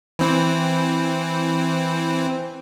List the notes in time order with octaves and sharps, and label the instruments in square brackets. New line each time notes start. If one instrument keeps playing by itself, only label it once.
[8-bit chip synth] E3 C4